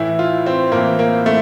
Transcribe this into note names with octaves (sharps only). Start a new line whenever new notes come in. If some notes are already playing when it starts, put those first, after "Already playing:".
Already playing: A2 E3 E4
F4
C4
A2 E3 A#3
A#3
A3